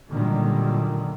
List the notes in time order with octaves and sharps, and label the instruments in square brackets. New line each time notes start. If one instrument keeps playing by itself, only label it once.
[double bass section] A#2 D3 D#3 F#3 G3 A3